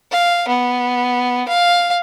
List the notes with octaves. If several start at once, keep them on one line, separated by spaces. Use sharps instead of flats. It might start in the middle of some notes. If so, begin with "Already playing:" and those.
F5
B3
F5